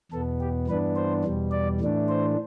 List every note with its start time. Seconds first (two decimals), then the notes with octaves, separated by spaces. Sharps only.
0.12 E2 B2 B3 A4
0.41 G4
0.68 G2 E3 B3 D4 B4
0.96 C5
1.25 E2 B2 G3
1.52 D5
1.80 A2 E3 A3 D4
2.09 C5